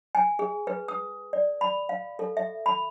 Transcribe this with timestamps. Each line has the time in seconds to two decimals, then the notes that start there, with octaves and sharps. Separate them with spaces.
0.15 G#5
0.39 G#4
0.67 B4
0.88 D#6
1.33 D5
1.61 B5
1.89 F5
2.19 A4
2.37 E5
2.66 B5